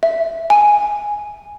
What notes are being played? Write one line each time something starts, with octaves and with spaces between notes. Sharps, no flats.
E5
G#5